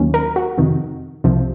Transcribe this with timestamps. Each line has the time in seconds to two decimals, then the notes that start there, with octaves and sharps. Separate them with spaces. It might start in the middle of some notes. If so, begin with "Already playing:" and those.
Already playing: D#2 D#3 F#3 A#3 C#4
0.14 A#4
0.36 F#4
0.58 F2 C3 D#3
1.24 C2 C3 F3